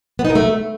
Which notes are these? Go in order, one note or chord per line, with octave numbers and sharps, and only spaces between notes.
B3
D#4
A#4
A3